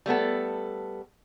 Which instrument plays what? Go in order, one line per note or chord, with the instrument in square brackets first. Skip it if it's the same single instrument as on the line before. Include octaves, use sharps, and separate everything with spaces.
[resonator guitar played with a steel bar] G3 A3 B3 A4